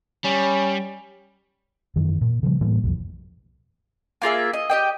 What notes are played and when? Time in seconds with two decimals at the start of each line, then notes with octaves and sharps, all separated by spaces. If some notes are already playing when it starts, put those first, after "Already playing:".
0.24 G3 C#4
1.96 F#2 D#3 E3
2.21 A#2
2.43 C#3 F3 G3
2.61 A2 E3 G3 A#3
2.83 B1 F2
4.22 A#3 F4 G#4 E5
4.53 D#5
4.70 G4 D#5 G5